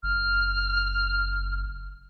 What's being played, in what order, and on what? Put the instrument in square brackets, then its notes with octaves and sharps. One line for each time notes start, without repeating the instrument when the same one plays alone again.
[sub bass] F#1 [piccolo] F6